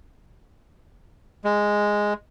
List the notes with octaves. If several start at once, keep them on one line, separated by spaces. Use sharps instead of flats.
G#3